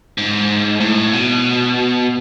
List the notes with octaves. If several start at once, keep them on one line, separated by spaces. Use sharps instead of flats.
G#2
A2
B2